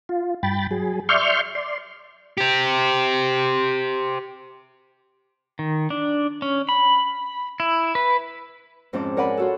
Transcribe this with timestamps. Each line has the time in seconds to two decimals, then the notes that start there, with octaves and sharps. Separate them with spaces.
0.09 F4
0.43 G2 G5 B5 A6
0.71 F#3 G#4
1.09 D5 E5 C6 C#6 F6 G6
1.55 D5 C6
2.38 G4 C5
5.59 D#3
5.90 D4
6.42 C#4
6.69 B5
7.60 E4
7.95 B4
8.93 F2 G#2 C4 C#4 A5 D6
9.17 A#4 C#5 D5 F#5 G#5 B5
9.37 F4 F#4 A4